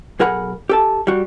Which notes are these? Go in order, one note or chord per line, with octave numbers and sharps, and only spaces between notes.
B1 G#4 A#4 F#5 B5
G4 A4 A5
G3 F#4